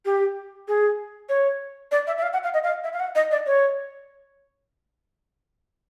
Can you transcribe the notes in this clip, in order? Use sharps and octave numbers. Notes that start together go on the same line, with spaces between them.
G4
G#4
C#5
D5
E5
E5
F5
F#5
F5
D#5
F5
E5
F5
F#5
D#5
D5
C#5